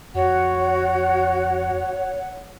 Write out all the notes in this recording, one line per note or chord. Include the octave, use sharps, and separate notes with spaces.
F2 F#4 C#5 F#5